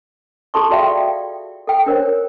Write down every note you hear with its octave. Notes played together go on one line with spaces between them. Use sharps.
F4 G#4 A4 A5 C6 C#6
F#4 A4 D5 E5 F5 G5
G5
A4 G5
D4 A#4 C5 C#5